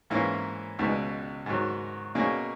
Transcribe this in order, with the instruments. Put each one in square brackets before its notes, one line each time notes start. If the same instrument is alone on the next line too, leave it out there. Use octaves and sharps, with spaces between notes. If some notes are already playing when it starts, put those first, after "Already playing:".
[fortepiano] G#2 E3 A#3 C#4 E4
C#2 B2 G#3
G#2 D#3 F#3
B2 A#3 C#4 G#4